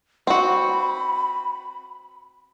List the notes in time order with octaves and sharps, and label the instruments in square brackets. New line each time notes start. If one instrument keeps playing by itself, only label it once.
[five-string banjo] C4 F#4 [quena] B5